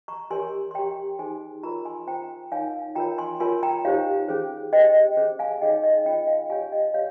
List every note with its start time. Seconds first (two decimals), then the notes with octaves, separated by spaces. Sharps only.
0.08 A#5 C#6
0.31 G4 A#4 C#5 G#5 C6
0.71 C6
0.75 G4 C#5 G5 A#5
1.19 D#4 G#4 C5 G#5 C6
1.63 F4 A#4 C#5 A#5 C#6
1.85 G#5 C6
2.07 C#4 F4 C5 G5 A#5
2.52 D#4 A#4 C#5 F5 G#5
2.95 F4 A#4 C#5 G5 A#5
3.18 G#5 C6
3.40 F4 A#4 C#5 G#5 C6
3.63 G5 A#5
3.85 D#4 G4 C5 C#5 F5
4.29 C#4 G#4 C5
4.73 G4 C5 D#5 G5
5.17 C#4 G#4 C5
5.39 F5 G#5
5.61 D#4 G#4 C#5 D#5 G5
5.83 D#5
6.06 C#4 F4 C5 D#5 G5
6.27 F5 G#5
6.50 G4 C#5 F5 G#5
6.72 D#5 G5
6.94 G4 C#5 F5